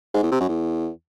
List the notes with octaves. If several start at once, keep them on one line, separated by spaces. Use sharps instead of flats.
G#2
E2
C3
F#2
E2